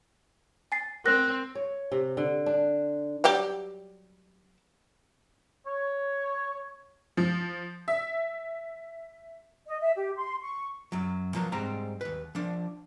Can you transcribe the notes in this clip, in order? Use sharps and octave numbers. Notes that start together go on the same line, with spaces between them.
G#5 A6 C7
C4 A#4 F#6 A#6
C#5
C3
D3
D4
F#3 G3 G4
C#5
F3
E5
D#5
E5
G4
C6
C#6
F#2 F#3
F3 F#3 A#3 B3
G#2 G3 G#3 C4 A#5
D#2 B4
F3 D4